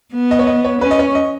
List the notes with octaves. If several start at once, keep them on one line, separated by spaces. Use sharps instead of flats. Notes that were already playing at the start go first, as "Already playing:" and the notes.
B3
D#5
C#5
D#5
C#5
C#4 B4
D#5
C#5
D#5